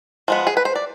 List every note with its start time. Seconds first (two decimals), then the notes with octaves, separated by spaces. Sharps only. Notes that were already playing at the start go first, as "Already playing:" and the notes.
0.28 F3 G#3 B3
0.47 G#4
0.57 B4
0.65 C5
0.75 D5